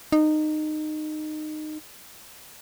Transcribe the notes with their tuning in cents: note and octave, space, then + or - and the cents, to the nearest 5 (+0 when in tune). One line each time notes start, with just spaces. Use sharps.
D#4 -20